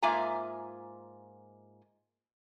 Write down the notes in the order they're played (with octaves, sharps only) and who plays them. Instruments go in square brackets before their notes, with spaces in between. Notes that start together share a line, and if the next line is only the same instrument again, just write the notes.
[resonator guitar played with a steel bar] G#2 A#3 F4 E5 G#5 A#5